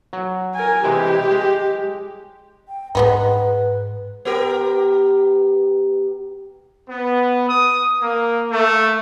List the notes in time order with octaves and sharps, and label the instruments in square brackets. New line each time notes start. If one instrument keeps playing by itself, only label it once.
[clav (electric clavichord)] F#3
[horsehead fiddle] A#4 G#5
[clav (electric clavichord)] C3 E3 G#3 [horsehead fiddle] G4
[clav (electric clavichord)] G#3
[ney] G5
[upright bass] G#2 [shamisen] G#3 B3 D#4 [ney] B4
[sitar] B3 G4 A#4
[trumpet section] B3
D#6
A#3
A3